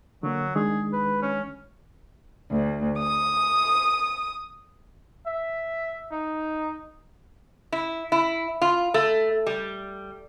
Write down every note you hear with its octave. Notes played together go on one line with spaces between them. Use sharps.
D3 F#3 A#3
D#3 G#3 D4 G#4
B4
C#4
D2
D#6
E5
D#4
E4
E4
F4
A3
G3